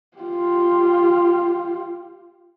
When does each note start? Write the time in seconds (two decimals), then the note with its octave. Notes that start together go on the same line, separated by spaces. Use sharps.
0.18 F4 G4